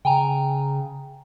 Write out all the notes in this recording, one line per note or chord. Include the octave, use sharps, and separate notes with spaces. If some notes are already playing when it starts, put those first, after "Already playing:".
C#3 G5 G#5 A#5